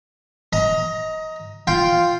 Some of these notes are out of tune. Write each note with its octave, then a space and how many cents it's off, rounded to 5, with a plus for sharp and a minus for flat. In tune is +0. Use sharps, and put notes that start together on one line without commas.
D#5 +20 A#5 +0
F4 +0 G5 +0